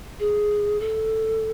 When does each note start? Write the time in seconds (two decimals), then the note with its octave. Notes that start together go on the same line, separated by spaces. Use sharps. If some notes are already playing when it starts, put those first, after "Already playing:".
0.19 G#4
0.79 A4